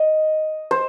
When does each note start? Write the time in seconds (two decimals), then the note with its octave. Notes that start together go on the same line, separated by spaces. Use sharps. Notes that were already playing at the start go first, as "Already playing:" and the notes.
Already playing: D#5
0.71 C5